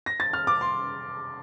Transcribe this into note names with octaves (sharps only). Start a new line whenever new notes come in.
A#6
A6
F6
D6
C6